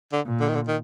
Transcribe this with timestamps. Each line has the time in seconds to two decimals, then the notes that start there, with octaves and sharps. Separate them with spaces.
0.12 D3
0.26 A#2
0.40 D3
0.48 D#3
0.55 D3
0.68 D#3